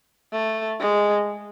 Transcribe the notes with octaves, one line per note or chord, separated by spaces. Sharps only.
A3
G#3